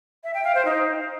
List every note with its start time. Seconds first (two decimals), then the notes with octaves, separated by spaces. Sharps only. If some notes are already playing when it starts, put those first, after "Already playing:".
0.24 E5
0.34 G5
0.44 F5
0.55 C5
0.65 D#4